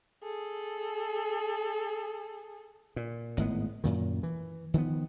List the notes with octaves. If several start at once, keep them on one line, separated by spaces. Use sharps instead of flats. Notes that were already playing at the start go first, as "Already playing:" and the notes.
G#4 A4
A#2
G#1 A2 G#3 B3
F#2 A#2 D#3
E3
D#3 F3 G#3 B3